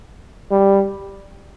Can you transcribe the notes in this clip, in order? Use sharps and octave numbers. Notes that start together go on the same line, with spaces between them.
G3